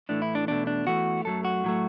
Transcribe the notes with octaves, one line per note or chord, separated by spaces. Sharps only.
A2 E3 A3 D4
E4
D4
E2 B2 A3 D4
D4
E2 E3 A3 F#4
F#2 F#3 A3 A4
F#4
A2 F#3 A3